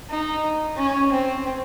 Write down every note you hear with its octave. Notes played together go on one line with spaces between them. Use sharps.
D#4
C#4
C4